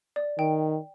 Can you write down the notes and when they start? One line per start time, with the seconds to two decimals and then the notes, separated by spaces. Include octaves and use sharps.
0.16 D5
0.38 D#3 G5